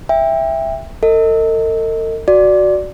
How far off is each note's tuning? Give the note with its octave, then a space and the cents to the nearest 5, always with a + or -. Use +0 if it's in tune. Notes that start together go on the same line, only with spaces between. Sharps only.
E5 +0 G5 +30
A4 +45 D#5 +15
F#4 +0 D5 +0